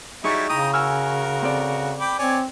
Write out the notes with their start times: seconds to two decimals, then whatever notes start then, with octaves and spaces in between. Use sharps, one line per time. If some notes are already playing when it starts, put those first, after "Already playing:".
0.24 F#3 G3 D#4 E4 G#4 C#6
0.49 C#3 E4 G5 A#5 D#6
0.74 F#4 A#4 G#5 E6 F6
1.42 C4 A4 D5
2.00 G5 B5 D6
2.19 C4 C#5 D5 G#5